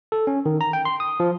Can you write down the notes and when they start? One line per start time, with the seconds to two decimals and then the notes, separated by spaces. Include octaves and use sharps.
0.12 A4
0.27 C#4
0.46 D#3
0.61 A#5
0.73 G5
0.85 C6
1.00 D#6
1.20 F3